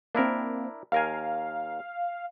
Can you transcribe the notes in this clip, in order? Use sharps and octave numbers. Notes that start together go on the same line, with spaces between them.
A#3 C4 D4 E4 A#4
D#2 A#4 F5 G#5